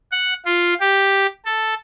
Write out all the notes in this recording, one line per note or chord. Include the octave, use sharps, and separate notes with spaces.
F#5
F4
G4
A4